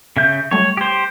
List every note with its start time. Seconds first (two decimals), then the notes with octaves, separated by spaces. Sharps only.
0.17 C#3 E5 G6
0.51 F#3 G3 A3 C#5
0.77 G4 C5